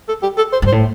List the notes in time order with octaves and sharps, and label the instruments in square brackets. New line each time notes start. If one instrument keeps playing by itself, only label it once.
[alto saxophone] A4
G4
A4
C5
[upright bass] G2
[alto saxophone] C5
[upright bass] A2